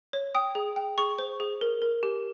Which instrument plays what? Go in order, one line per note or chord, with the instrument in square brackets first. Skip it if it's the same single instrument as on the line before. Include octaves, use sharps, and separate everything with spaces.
[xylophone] C#5
G5 D#6
G#4
G5
G#4 C#6
C5
G#4
A#4
A#4
G4